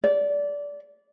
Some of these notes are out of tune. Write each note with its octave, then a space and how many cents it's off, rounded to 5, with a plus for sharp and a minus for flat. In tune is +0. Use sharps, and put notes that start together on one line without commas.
D5 -20